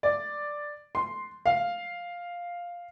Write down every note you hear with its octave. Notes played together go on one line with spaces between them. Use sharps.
D5
C6
F5